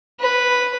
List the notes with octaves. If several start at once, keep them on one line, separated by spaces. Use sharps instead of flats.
B4